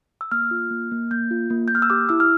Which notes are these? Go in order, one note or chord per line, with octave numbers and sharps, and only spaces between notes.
E6
A#3 F6
F4
A#3
A#3
A#3 G6
F4
A#3
A#3 G6
F6
E6
G4 D6
E4 E6
F6